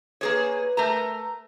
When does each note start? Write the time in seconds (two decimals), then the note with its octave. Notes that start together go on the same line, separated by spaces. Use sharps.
0.21 A#3 G#4 B4 C#5
0.77 A3 A#4 A#5